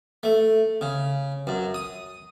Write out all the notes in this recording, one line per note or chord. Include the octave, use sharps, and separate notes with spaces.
A3
C#3
F#2
D#6